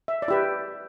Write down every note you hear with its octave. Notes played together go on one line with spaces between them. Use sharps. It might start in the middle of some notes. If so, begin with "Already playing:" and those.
E5
D5
E4 G4 B4 E5